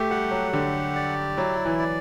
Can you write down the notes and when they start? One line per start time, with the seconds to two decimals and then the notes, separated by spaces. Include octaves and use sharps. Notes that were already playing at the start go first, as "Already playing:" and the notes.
Already playing: A3 G4
0.11 G3 F#5
0.31 F#3
0.52 D3 G4
0.95 D5
1.36 F#3 E4
1.66 E3
1.79 D5